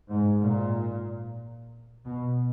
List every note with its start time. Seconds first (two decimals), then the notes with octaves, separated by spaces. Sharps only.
0.10 G#2
0.42 A#2
2.05 B2